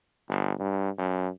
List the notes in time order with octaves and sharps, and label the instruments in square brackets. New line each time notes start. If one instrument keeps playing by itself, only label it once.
[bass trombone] G1
G2
F#2